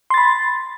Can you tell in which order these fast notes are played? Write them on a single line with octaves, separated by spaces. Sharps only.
C6 A6 B5